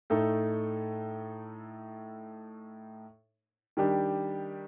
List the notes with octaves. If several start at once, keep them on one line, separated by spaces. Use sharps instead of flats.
A2 A3 D#4 A4
D#3 G3 D4 G4